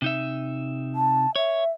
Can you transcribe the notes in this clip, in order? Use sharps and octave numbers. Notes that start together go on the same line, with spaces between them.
C3 D#4 E5
A5
C#5 E5